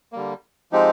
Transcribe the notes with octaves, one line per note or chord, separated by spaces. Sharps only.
D3 G3 A#3
F3 G#3 C4 D#4 G4